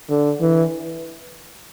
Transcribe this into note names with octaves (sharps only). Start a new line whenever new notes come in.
D3
E3